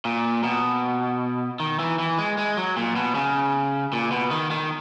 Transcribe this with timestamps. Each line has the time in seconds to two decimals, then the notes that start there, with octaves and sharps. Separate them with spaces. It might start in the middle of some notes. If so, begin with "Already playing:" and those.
0.05 A#2
0.44 B2
1.60 D#3
1.79 E3
1.99 E3
2.18 G#3
2.38 G#3
2.57 F#3
2.77 A#2
2.96 B2
3.15 C#3
3.93 A#2
4.11 B2
4.31 D#3
4.51 D#3